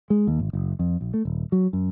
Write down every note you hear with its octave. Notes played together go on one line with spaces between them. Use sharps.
G#3
D#2
G#1
F#1
F2
A#1
A3
D#1
F#3
F#2